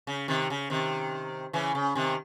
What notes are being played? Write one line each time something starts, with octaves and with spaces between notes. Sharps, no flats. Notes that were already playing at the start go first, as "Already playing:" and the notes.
C#3
C3 D#3
C#3
C3 D#3
C#3 E3
C#3
C3 D#3